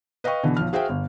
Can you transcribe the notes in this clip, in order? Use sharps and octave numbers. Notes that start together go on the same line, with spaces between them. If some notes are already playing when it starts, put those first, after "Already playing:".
B4 D#5 F5 G5 C#6
B2 D3 E3
B1 F3 F6
F#4 G#4 C5 E5 F5 G5
G1